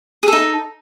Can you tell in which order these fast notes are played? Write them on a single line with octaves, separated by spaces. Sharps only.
G#4 A4 D#4